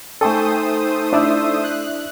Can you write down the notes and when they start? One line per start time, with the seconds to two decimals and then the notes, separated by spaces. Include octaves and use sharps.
0.21 A3 D#4 A4 C5 G5 G#5 C#6 D#6
1.13 D4 E4 D5 E5 E6
1.63 F#6